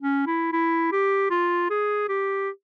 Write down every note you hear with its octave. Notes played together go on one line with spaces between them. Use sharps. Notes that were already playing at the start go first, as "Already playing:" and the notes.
C#4
E4
E4
G4
F4
G#4
G4